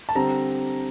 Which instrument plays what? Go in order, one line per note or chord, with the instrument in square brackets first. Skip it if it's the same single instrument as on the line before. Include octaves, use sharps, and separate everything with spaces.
[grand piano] A5
D3 G3 C4 A#5